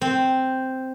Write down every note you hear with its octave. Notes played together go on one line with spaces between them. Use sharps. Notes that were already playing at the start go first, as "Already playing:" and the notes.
C4